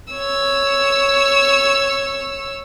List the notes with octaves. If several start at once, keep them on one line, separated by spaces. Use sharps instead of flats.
C#5 E6